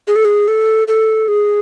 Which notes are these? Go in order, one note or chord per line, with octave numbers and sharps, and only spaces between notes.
G#4
A4
G#4
A4
A4
G#4